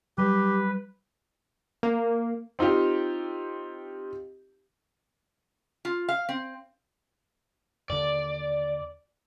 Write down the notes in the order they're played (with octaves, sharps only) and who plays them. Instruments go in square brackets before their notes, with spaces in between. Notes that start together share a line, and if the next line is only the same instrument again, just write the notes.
[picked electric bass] F#3 G3 [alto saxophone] G4 [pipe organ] B4
[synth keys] A#3
[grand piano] C4 D#4 F4 G4
[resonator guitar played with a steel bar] F4
F5
C4
[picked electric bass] D#2 D3 [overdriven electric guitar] D5